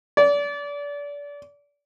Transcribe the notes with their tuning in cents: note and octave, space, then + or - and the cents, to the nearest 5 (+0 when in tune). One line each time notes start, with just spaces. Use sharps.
D5 -30